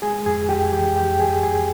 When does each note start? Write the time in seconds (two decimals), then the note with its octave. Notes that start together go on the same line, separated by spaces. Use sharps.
0.02 G#3 G#4 G#5
0.26 F2 G#4 G#5
0.49 F2 G4 G5
0.72 E3 G4 G5
0.96 F2 G4 G5
1.20 F2 G#4 G#5
1.43 F2 G#4 G#5